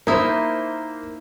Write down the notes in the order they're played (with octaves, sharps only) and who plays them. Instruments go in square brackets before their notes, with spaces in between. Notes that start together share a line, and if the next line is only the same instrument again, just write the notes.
[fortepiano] A#3 C5 [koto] D#4 E4